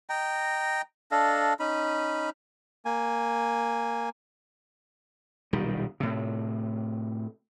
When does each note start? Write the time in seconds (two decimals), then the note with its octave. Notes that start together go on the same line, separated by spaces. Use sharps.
0.10 D#5 G5 A#5
1.12 D4 A4 D#5 F5
1.60 C#4 D#4 B5
2.85 A#3 G#5
5.53 D#1 B1 D#3 G3
6.00 A2 C3